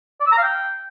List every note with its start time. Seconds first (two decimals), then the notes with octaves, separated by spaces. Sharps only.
0.21 D5
0.26 E6
0.32 A#5
0.38 F5
0.43 G5